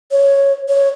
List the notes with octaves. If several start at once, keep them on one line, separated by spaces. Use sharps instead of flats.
C#5
C#5